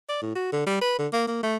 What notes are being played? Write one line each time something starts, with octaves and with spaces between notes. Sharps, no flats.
D5
A2
F#4
D3
G3
B4
D3
A#3
A#3
A3